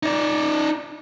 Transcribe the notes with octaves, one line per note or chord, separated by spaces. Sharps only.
D#4 D5